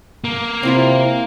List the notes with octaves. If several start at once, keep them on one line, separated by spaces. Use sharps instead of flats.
A#3
C3 C4 E4 F4